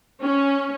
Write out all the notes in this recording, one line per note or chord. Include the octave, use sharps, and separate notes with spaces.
C#4